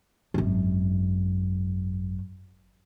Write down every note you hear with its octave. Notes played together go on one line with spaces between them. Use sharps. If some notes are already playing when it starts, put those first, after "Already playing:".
G#1 F#2